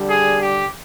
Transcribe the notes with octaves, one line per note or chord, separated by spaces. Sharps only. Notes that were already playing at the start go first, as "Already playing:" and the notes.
Already playing: D3 G3
G#4
G4